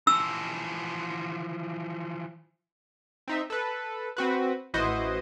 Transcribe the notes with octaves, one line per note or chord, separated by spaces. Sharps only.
E3 F3 E6
C4 D#4 E5
A4 B4
C4 F#4 B4
A1 E4 F#4 B4 C5 D#5